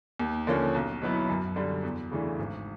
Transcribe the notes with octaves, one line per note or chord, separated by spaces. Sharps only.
D#2
D3 F3 A#3 C#4
B1
B2 F#3 B3 E4
F#2
D3 G3
E2
C#3 E3 A3 D4
G#1